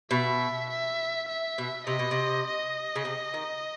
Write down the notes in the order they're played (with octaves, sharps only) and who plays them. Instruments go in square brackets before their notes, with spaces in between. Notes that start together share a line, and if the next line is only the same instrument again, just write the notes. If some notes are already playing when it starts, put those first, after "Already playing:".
[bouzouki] B2 [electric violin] E5
[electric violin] E5
E5
[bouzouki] B2
[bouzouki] C3 [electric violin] D#5
[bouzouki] B2
C3
[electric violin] D#5
[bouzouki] C#3
C3
D#3